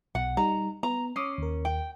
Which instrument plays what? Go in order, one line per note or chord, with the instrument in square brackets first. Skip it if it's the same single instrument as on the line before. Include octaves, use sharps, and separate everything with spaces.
[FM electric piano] B1 B2 [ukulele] F#5
[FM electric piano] G3 D#4 [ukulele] A#5
[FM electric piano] B3 [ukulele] A#5
[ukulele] C#4 [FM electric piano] D6 D#6 C7
[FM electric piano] D#2 A#4
[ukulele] G5